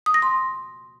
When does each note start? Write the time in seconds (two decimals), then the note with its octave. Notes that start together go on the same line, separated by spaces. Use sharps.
0.06 D#6
0.14 A#6
0.22 C6